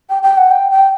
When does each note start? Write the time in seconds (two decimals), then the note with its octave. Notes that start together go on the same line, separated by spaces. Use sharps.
0.09 G5
0.23 G5
0.37 F#5
0.51 G5
0.71 G5